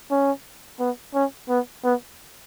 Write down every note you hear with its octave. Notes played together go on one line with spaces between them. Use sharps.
C#4
B3
C#4
B3
B3